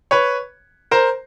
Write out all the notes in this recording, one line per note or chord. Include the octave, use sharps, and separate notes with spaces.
B4 C#5
A#4 C5